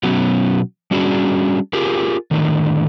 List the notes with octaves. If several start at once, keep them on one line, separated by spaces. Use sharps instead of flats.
B2 F#3 B3 C#4 F#4
G3 C#4 D4 F#4 G#4
F4 G4 G#4 A#4
A2 D3 D#3